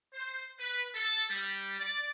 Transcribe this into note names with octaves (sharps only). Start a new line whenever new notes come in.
C5
B4
A4
G3
D5